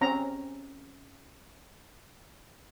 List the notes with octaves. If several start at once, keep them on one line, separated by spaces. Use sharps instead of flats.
C4 C#4 A#5